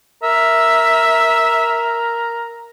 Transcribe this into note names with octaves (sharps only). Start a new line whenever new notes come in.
A#4 E5